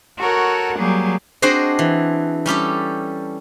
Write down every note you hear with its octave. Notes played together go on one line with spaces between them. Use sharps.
F#4 A4 A#4 C#5 F#5
F#3 G3 A#3 G#4
C4 D4 F#4 G#4 C5 D#5
E3
G3 C#4 G4 A4